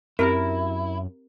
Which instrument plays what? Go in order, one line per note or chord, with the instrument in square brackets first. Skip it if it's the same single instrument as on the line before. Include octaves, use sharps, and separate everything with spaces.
[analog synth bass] F#2 [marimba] C4 G4 E5 [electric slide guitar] E4 [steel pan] A#4